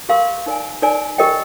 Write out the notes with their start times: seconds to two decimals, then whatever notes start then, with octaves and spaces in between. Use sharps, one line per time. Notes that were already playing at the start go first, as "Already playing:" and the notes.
0.09 G4 A#4 F5 C6
0.46 D#4 A#4 D5 G#5
0.82 D#4 A#4 D5 G#5
1.18 G4 A#4 D#5 G5